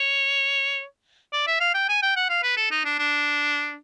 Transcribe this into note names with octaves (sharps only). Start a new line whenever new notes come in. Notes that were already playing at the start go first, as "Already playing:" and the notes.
Already playing: C#5
D5
E5
F5
G5
G#5
G5
F#5
F5
B4
A4
D#4
D4
D4